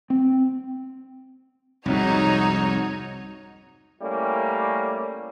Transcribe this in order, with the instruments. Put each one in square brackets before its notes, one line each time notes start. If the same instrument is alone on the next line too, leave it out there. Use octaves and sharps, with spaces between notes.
[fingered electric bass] C4
[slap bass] C2 F2 G#2 [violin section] D#4 F#4 C#5
[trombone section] G3 A3 A#3 C#4 E4